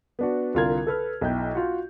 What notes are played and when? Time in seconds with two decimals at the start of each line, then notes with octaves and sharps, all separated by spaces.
0.19 B3 D4 F#4
0.54 C2 D3 F4 A#4 G#6
0.87 A4 B4 F6
1.21 B1 E4 G5 G6
1.55 F4 F#4